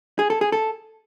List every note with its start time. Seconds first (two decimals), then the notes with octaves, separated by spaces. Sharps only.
0.19 G#4
0.30 A4
0.41 G#4
0.52 A4